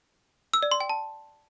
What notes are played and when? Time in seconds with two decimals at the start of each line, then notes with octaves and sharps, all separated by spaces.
0.54 E6
0.63 D5
0.72 C6
0.80 G5
0.89 A5